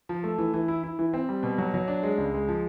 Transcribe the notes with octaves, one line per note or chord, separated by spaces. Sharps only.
F3
A3
E3
E3
E4
E4
E3
C4
G3
B2
F#3
F#3
D4
G#3
C#2
G#3
F3